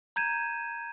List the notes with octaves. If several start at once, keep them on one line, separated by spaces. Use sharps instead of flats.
A#5 G6 G#6 D#7 E7